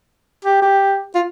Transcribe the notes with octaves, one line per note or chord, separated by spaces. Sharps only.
G4
G4
F4